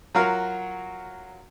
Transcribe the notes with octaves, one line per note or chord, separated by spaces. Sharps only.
F#3 F4 F#4 A#4 F5